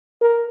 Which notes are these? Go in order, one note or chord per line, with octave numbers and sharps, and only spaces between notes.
A#4